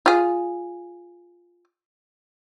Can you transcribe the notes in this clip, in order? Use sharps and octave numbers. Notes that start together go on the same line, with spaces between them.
F4 G#4